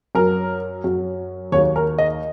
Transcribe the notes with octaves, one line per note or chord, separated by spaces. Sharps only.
F#2 F#3 A#4
F#2 F#3
D#2 D#3 F#3 C#5
A#4
D#5